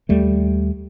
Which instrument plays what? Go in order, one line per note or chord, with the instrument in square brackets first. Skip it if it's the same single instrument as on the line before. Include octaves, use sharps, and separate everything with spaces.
[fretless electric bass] D#2 G3 A3